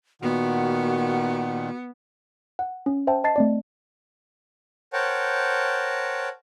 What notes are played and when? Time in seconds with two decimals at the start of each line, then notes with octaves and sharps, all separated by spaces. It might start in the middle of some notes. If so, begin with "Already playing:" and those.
0.22 A#2 D#3 B3 F#4 F#5
2.59 F#5
2.86 C#4
3.07 C5 E5 G5 A5
3.24 D#5 A5 A6 C7
3.36 A3 C4 D5
4.93 A#4 C5 C#5 F#5 G5 A5